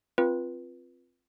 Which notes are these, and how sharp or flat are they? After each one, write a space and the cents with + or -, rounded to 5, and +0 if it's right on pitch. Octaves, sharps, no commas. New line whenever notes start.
C4 +0 F4 +0 B4 -20